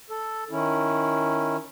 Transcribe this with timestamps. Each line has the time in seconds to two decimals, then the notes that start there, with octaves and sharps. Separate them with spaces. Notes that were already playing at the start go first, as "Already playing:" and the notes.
0.10 A4
0.51 D#3 C#4 E4